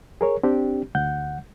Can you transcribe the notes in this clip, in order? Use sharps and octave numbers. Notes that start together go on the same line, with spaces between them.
G#4 A#4 C#5
C4 D4 G4
D2 F#5 G6